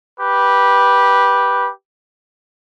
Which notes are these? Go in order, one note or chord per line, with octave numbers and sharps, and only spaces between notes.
G4 B4